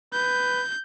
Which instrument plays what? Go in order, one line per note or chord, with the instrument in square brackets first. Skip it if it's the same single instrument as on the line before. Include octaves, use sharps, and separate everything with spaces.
[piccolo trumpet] B4 [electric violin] G6